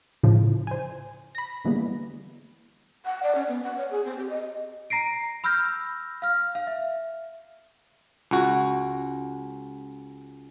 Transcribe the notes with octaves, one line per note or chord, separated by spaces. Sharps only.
A2 C#3 F3
C5 G#5
B5 A#6
D3 E3 G3 G#3 A#3 B3
F#5
D5
C#4
B3
F#5
C#5
G#4
C4
G4
D#5
A#5 A#6 C7 D7
B5 E6 F6 G6 A#6
F5 F6
F5
E5
C#2 F#4